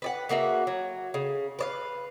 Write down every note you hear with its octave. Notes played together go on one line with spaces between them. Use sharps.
B4 D5 F#5
C#3 A#3 F#4 E5
F#3
C#3
B4 D5 F5